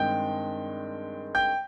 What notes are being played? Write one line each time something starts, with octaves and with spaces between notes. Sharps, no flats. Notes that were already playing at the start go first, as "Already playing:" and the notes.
Already playing: G2 D#3 G#3 C4 G5 G6
G5 G6